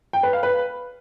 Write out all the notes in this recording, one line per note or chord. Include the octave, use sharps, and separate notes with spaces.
G5
B4
F5
B4